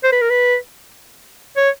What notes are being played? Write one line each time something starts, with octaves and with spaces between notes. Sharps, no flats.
C5
B4
A#4
B4
C#5